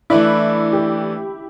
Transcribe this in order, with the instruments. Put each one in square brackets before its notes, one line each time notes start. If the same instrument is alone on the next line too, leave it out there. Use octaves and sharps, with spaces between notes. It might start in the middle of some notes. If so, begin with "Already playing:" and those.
[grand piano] E3 A3 D4 B4 D5 [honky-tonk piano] E4
[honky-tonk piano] G4